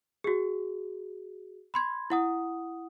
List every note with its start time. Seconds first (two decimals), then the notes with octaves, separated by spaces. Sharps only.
0.24 F#4 G#4
1.74 B5 C6 G#6
2.10 E4 F#5 D#6